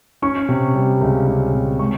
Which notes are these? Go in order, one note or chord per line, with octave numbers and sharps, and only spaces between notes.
C#4 C#6
C3
G3
C#2
C#4
C3
G#3 C#6